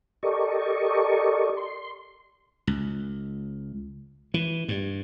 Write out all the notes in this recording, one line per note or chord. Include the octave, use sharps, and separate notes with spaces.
G4 A4 A#4 D5 D#5 C#6
C6
C#2
E3
G2